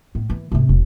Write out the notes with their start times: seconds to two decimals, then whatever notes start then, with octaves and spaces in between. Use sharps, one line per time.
0.15 A2
0.30 E3
0.52 G#1 C3
0.69 E1